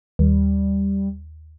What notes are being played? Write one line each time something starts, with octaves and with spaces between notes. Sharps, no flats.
D#2 G3